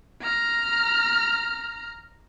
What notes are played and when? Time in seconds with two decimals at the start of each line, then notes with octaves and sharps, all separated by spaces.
0.22 A#5 F6